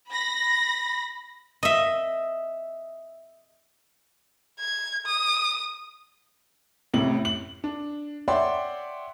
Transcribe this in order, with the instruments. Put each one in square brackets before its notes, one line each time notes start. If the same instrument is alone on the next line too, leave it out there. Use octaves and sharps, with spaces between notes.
[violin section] B5 A#6
[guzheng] D#5 E5
[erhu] G#6
D#6
[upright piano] A1 A2 C3 F#7
F#7
D4
C#5 D5 E5 F#5 G5 C6